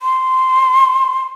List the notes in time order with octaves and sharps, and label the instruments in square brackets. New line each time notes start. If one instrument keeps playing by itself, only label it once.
[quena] C6